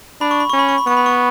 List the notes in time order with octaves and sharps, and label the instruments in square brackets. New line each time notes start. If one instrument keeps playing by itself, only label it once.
[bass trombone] D4 [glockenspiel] B5
[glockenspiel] C#6
B5
[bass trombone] C#4 [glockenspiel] C#6
[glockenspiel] B5
C#6
B5
[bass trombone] B3 [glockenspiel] C#6
[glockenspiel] B5
C#6